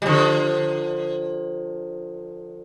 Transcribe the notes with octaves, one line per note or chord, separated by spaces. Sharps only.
G3
D3 F3